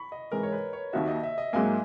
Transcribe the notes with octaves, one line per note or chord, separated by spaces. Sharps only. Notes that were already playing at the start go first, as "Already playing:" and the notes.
Already playing: B5 C#6
D#5
G#2 E3 G#3 A#4
C#5
B4
C#5
D#2 D#3 A#3 D#4 F#4 E5
D#5
E5
D#5
G#2 F#3 A#3 G#5